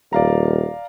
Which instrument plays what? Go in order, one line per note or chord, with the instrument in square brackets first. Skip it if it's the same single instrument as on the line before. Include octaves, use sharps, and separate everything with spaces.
[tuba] D#1 [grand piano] D5 F5 A#5